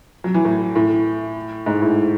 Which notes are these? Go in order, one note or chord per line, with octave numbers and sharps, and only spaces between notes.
F#3
E3
A2
A2
G#2
A2